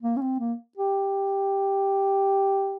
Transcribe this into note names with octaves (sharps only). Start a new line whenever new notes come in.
A#3
C#4
C4
A#3
G4